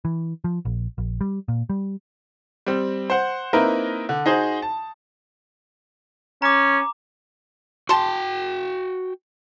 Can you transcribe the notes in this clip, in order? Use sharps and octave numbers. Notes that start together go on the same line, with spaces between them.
E3
F3
A#1
A#1
G3
A#2
G3
G3 C4
C5 F#5
A#3 C4 D#4 E4 A#4 B4
D3
D#4 F#4 G#4 C5
A5
C#4 A#5 D6
F#4 G5 A5 C6